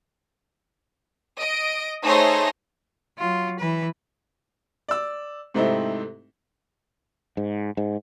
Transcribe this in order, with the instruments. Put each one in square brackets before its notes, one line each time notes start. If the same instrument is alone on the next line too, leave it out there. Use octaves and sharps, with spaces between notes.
[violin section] D#5 D7
A3 D#4 G#4 C5 C#5 A#6
[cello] F#3 F4
E3 B4
[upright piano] D5 E6
G#2 C3 A3 C4 D#4 E4
[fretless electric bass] G#2
G#2